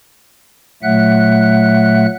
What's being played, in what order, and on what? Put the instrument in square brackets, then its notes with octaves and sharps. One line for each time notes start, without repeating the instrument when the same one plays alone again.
[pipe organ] A#2 F#3 A3 E5 F#5 F#6